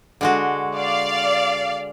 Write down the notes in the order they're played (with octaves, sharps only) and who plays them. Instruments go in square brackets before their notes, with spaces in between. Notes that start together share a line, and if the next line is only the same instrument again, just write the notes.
[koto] D3 G#3 F#4
[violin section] D5 F5